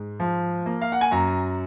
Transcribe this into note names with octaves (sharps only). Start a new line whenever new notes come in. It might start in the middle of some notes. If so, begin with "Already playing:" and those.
Already playing: G#2
F3
A#3
F5
F#5
G#5
F#2 A#5